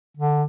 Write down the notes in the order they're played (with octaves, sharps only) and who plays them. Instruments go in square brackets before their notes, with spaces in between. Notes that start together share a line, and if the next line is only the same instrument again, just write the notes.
[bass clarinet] D3